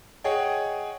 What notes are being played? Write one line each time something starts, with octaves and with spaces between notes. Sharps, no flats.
G#4 C#5 D#5 F#5 G5